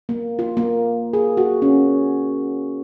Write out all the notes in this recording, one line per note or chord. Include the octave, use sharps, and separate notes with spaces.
A#3
F4
A#3
G#4
F#4
C#4